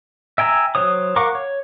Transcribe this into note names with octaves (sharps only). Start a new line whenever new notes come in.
E5 G5 G#5 A#5 E6
F#3 C5 C#5 D#6
A#4 F5 F#5 C#6 D6
C#5